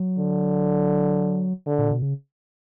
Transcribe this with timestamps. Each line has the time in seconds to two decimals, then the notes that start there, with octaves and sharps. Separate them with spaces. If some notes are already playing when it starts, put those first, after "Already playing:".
Already playing: F#3
0.19 D3
1.66 D3
1.79 A#2
1.91 B2
2.02 C#3